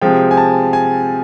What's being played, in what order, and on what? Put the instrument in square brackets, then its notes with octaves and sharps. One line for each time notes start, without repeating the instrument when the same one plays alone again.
[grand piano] C3 F3 G#3 G5
G#5
A5
G#5